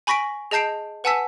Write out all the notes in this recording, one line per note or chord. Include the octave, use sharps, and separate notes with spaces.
G#5 B5 C#6 A#6 B6 D7
G#4 D#5 A5 G6 C7 D7
B4 F#5 G#5 A5 E6 B6